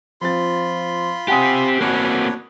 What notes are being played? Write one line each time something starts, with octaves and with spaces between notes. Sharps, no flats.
F3 C4 F4 B5 C6 A6
C4 G4 F#5 G#5 D#6
A#3 C4 D4 F#4 B4 C#5